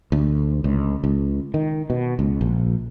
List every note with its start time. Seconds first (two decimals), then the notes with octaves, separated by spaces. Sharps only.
0.12 D2
0.64 C#2
1.04 C#2
1.54 D#3
1.90 B2
2.19 C#2
2.41 A#1